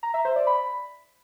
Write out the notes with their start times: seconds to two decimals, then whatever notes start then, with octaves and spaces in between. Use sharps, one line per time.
0.03 A#5
0.14 E5
0.25 C5
0.36 D5
0.47 B5